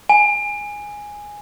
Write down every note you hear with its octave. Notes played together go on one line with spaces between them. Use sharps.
G#5